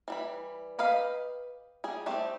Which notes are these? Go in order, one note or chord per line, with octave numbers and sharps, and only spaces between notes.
E3 G3 B5
G4 B4 D#5 F5
G3 G#4
G3 A3 C4 G4